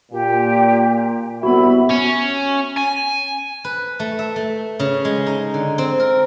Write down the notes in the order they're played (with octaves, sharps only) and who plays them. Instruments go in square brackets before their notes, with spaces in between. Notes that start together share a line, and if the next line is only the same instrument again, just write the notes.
[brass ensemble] A#2 [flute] G4
[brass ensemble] C2 E5 [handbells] B3 F#4 [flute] B5
[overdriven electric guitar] C#4
G#5
[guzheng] B4
A3
E5
A3
C#3
G#3
D#4
D3
C4
A#4